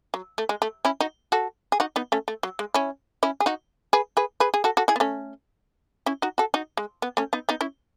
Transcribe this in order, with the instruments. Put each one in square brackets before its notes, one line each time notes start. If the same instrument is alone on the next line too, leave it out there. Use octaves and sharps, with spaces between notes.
[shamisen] F#3
A3
G#3
A3
C#4 E4
D#4 F#4
F#4 A4
G#4
D#4 F#4
B3 D#4
A3 C#4
A3
F#3
G#3
C#4 E4
C#4 E4
G#4
D#4 F#4
G#4 B4
G#4 B4
G#4 B4
G#4
F#4 A4
F#4 A4
E4 G#4
B3
A3 C#4
C#4 E4
D#4 F#4
F#4 A4
D#4 F#4
G#3
B3
A3 C#4
B3 D#4
B3 D#4
C#4 E4